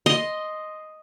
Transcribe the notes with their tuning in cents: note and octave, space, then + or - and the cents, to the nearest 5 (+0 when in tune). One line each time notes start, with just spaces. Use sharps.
D#5 +0 C6 +0